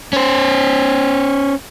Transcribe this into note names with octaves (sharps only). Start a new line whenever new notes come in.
C#4 C5